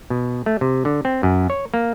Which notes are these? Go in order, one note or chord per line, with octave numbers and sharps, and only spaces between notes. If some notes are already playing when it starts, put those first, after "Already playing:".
B2
A3
C3
D3
C4
F#2
C#5
A#3